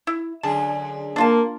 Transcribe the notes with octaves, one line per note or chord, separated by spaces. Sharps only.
E4
F#2 D3 G#4 A5
A#3 D4 F4 A5